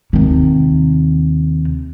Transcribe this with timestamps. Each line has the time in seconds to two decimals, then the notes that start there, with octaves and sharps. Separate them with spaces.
0.13 D#2 C3